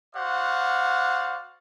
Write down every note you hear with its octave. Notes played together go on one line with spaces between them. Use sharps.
F#4 C5 D5 F5 F#5